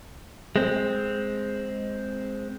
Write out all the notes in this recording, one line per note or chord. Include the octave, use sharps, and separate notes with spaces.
G#3 C4